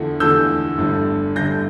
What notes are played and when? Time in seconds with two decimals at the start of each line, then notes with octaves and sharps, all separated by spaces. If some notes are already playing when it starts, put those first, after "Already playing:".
Already playing: E2 D3 F3 A3
0.20 E2 D3 F3 A3 E6 G6
0.78 G1 G2 D3 A3
1.36 G1 G2 D3 A3 G6 A#6